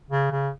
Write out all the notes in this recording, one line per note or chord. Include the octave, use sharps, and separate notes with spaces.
C#3
C#3